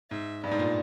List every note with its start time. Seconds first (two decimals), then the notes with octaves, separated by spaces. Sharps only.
0.10 G#2 E5
0.43 G2 D5
0.51 G#2
0.59 A#2